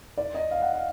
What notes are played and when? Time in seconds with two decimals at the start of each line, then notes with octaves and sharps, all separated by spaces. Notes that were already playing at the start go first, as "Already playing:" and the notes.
0.18 D5
0.34 D#5
0.51 F5
0.62 F#5
0.73 F5